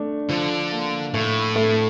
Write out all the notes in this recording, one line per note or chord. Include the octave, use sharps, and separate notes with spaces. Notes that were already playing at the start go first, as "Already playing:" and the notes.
Already playing: A3 D4
D3 F3
A#3
A2 A3
A3